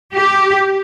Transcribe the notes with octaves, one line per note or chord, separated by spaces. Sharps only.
G4